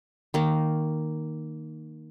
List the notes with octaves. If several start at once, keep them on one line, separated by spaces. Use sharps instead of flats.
D#3 A#3